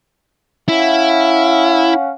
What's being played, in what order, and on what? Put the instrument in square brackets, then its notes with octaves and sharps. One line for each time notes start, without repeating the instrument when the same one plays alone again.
[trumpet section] C#4 F5 F#5 [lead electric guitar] E4